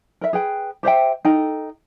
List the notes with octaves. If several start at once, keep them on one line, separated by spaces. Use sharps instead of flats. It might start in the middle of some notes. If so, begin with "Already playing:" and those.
A#4 E5
G#4 B4 G5
G4 C5 E5 G5
D#4 A4 G5